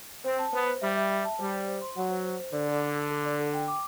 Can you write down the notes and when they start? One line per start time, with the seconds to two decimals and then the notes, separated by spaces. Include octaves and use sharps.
0.24 C4 C5
0.39 A5
0.53 B3 C5
0.67 C5
0.81 G3 E5
0.96 E5
1.10 E5
1.25 A5
1.39 G3 C5
1.53 C5
1.68 C5
1.81 C6
1.96 F#3 F#5
2.10 C5
2.25 C5
2.39 C5
2.53 D3 D5
2.68 A4
2.82 A4
2.96 A4
3.10 A4
3.25 D5
3.39 A4
3.54 G5
3.68 D6